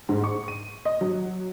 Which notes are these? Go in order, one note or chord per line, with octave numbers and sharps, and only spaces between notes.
G#2
C#6
D#7
D#5
F#3